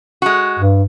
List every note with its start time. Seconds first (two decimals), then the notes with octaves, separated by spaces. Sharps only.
0.22 G#3 F#4
0.59 G2